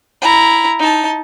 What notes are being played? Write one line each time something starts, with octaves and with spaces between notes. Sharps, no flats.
E4 A#5
D#4 A5